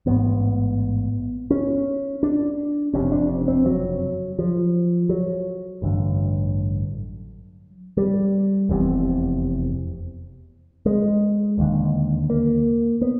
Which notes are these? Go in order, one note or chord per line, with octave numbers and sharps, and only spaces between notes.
A1 G#2 B3
C#4
D4
F#1 F2 C3 C#4
D4
C4
F#3
F3
F#3
A1 G2 D3
G3
F1 E2 C3
G#3
E1 D#2 D3
A#3
B3